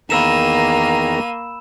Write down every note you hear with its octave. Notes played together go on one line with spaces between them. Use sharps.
E2 D#3 A#3 A#5 B5 E6 D#7 E7